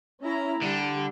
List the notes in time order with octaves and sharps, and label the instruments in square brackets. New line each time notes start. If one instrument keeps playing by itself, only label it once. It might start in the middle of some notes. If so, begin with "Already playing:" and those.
[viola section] C#4 E4 A#5
[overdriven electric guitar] D3 D4 [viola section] G3